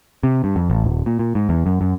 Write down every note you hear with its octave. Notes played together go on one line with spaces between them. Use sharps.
C3
G2
F2
A1
D#1
A#2
A#2
G#2
E2
F#2
F#2